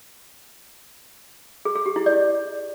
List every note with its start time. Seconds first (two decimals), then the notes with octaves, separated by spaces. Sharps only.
1.65 G#4
1.76 G#4
1.86 G4
1.96 E4
2.06 D5